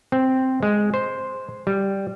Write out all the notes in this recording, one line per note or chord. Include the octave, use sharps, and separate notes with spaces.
C4
G#3
C5
G3